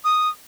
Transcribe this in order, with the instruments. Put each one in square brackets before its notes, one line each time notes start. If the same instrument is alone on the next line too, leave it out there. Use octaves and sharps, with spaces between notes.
[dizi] D#6